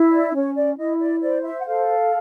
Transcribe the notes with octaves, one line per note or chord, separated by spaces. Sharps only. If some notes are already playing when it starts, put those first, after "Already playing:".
Already playing: E4
D5
C#4 C#5
D5
E4 D#5
D5
C5 D5
E5
F#5
A4 F5